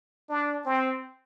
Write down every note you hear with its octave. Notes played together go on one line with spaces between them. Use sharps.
D4
C4